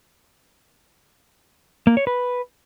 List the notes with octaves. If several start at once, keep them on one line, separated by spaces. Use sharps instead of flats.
A#3
C#5
B4